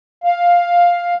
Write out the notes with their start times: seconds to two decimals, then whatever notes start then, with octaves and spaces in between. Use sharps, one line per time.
0.24 F5